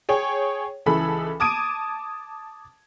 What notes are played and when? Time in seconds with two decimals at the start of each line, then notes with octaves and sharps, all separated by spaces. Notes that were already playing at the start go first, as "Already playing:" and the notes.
0.09 G#4 C#5 G5
0.86 C#2 E3 G#4 A4 B5
1.40 A5 D6 D#6 G#6 D7 D#7